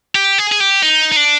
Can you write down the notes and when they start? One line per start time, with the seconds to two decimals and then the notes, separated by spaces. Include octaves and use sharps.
0.15 G4
0.38 G#4
0.52 G#4
0.60 G4
0.83 D#4
1.12 D#4
1.16 D4